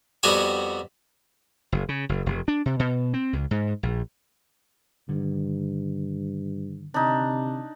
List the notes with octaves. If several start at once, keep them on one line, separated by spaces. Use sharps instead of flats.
F2 G3 B3 F#4 G#5
F#1
C#3
F#1
F1
D4
C3
B2
C4
C#2
G#2
A#1
G2 D3 D#3
C3 D4 D#4